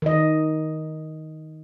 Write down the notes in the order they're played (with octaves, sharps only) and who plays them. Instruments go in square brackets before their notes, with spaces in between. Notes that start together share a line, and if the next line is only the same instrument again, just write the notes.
[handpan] D#3 D#5